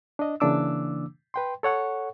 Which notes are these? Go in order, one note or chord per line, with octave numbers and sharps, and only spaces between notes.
D4 D#5
C#3 E3 A#3 D4 D6 E6
B4 G5 C6
A4 C#5 F#5 C#6